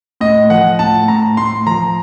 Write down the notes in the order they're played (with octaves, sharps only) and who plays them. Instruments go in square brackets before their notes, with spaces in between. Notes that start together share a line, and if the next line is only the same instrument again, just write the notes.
[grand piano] A2 D#5
F3 F#5
A2 A5
A2 A#5
A2 C6
F3 A#5